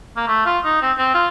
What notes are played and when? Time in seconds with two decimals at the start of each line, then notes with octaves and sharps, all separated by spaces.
0.16 A#3
0.28 A3
0.45 F4
0.64 D#4
0.82 C4
0.98 C4
1.14 F4